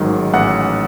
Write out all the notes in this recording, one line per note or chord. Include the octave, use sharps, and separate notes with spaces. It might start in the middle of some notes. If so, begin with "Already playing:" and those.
Already playing: A1 G#2 D#3 F#3
A1 F#5